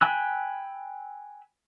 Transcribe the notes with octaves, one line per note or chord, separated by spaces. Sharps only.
G5 G#5 B5 E6 F#6